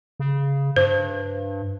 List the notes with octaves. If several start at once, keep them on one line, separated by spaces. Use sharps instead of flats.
C#3
G2 C5